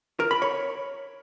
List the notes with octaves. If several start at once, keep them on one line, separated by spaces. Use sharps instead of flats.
A#4
B5
C#5